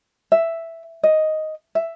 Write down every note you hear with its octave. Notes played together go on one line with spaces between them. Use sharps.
E5
D#5
E5